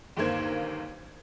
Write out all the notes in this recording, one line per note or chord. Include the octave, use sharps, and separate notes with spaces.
G1 D#2 A#3 C5 G#6